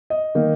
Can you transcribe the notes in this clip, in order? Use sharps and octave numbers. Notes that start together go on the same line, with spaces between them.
D#5
D#3 A#3 D#4